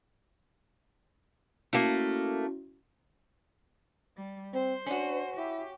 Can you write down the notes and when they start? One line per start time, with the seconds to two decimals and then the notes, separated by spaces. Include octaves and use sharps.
1.73 A3 A#3 C#4 E4 F#4
4.17 G3
4.54 C4 C5
4.86 C#4 D4 F#4
5.37 E4 G4